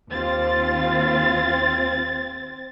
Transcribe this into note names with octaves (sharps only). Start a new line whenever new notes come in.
D#2 C4 F4 A6